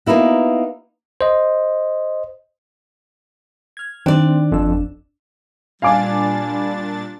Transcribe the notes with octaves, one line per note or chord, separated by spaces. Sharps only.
A#3 B3 D#4 E4 F#4
C5 D#5
F6 G#6
D#3 C4 D4 D5
G1 F2 E6
A#2 G3 D4 F5 G#5 D6 A6